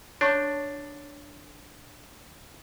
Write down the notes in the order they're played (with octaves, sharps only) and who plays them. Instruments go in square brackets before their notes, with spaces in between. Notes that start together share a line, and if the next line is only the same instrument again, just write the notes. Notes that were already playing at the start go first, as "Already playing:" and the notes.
[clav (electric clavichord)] D4 [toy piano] C#5 A5 C#6